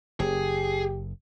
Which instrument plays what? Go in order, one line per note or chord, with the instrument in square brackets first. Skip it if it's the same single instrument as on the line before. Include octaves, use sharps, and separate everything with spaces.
[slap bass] F#1 [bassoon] G4 [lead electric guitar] G#4